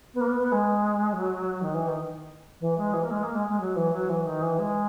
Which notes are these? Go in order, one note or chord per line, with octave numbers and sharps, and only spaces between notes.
B3
A#3
B3
B3
G#3
F#3
D#3
E3
D#3
E3
G#3
E3
A#3
G#3
A#3
G#3
G#3
F#3
E3
F#3
E3
D#3
E3
G#3